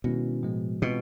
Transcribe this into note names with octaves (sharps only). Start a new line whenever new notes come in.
B2 D#3 G#3 C#4 E4
A2 F3 G#3
B2 E3 G#3 C4 F4